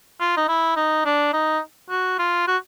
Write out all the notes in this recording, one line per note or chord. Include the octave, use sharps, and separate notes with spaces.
F4
D#4
E4
D#4
D4
D#4
F#4
F4
F#4